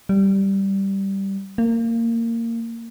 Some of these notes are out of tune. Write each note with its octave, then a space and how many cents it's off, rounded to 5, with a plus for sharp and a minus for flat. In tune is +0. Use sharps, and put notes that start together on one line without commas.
G3 -5
A#3 -20